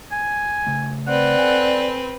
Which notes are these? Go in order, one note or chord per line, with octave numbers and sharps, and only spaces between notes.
G#5
C#3 A3
C4 B4 D5 F#5
A4 G#5